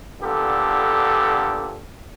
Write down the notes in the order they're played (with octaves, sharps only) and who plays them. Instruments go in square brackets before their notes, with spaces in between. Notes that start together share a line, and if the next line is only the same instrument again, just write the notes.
[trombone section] A#2 D3 B3 G4 A4